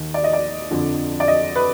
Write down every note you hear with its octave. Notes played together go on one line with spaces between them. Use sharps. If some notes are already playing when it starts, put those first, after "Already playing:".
Already playing: D#2 D#3
D5
D#5
D5
F2 D3 F3
D5
D#5
B4